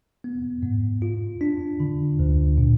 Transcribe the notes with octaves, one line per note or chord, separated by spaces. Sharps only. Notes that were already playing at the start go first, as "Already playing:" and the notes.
B3
G#2
F4
D4
D3
D2
A#2